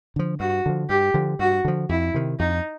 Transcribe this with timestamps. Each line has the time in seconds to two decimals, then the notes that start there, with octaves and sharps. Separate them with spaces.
0.16 D3 F3
0.40 G2 F#4
0.66 D3 F3
0.89 G2 G4
1.14 D3 F3
1.39 G2 F#4
1.65 D3 F3
1.89 F2 E4
2.14 C3 D#3
2.39 F2 D#4